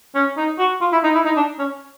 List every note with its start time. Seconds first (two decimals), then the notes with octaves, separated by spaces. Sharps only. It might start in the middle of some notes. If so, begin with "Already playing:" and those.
0.15 C#4
0.37 D#4
0.59 F#4
0.81 F4
0.92 E4
1.04 D#4
1.15 E4
1.25 D#4
1.37 D4
1.59 C#4